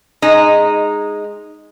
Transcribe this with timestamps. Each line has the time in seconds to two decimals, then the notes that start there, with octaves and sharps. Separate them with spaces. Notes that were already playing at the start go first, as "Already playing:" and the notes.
0.22 G#3 D#4